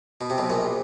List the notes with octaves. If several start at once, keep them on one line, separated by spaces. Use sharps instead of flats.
B2
C3
B1 B2
A#1 A#2